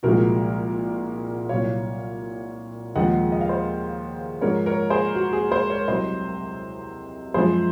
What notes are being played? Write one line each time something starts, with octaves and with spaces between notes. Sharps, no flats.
C2 A#2 F3 G#3 F#4 A#4
C2 A#2 F#3 C#5 F5
D#2 C#3 F3 G#3 D#5 F#5
D#5
F5
C5 D#5
G#2 F3 G#3 A#4 C#5
A#4 C#5
G#4 C5
F#4
G#4
G#4 C5
A#4 C#5
C2 C3 F#3 C5 D#5
F#2 F3 G#3 G#4 C5